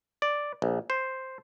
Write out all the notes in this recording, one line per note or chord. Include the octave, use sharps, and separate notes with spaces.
D5
A#1
C5